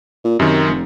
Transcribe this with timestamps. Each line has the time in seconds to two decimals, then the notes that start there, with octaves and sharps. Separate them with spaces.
0.24 A#2
0.39 F#2 C3 D#3
0.67 F1